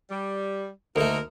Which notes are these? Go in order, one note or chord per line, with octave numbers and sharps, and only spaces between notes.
G3
D2 A3 A#3 D#4 A#4